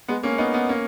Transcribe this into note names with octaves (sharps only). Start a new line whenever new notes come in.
G#3 B3
A#3 C#4
B3 D#4
B3 D#4
A#3 C#4